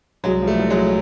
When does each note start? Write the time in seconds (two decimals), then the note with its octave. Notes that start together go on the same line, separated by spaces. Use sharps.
0.24 C2 F#3 G#3
0.42 F3
0.47 G3 A3
0.59 C2
0.70 F#3 G#3